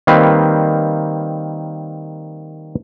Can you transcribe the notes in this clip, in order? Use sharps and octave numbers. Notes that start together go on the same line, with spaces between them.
D#3 G3 A#3 C4 B4